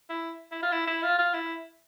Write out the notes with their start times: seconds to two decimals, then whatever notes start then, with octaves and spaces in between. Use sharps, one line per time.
0.10 E4
0.52 E4
0.63 F4
0.72 E4
0.87 E4
1.03 F4
1.18 F4
1.34 E4